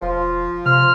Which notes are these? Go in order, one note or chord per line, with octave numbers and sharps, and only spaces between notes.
E1 F3 C6
C3 C6 F6